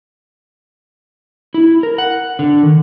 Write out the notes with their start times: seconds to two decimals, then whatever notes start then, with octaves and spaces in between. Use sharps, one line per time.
1.54 E4
1.83 A#4
1.98 F#5
2.39 D3
2.63 D#3